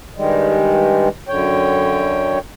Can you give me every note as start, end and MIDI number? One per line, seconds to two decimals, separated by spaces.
0.16 1.08 43
0.16 1.08 51
0.16 1.08 55
0.16 1.08 56
1.28 2.38 42
1.28 2.38 50
1.28 2.38 73
1.28 2.38 79